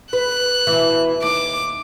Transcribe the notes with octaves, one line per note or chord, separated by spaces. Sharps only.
B4 F#6
B2 E3
D#2 D6